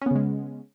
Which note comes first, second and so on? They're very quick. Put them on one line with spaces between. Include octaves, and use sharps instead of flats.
C#4 B3 C#3 G#3